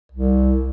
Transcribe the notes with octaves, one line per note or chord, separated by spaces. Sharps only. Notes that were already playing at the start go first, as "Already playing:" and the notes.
C2